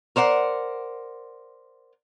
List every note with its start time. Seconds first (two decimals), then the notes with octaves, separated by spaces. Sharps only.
0.16 A#4 C5 D5 F#5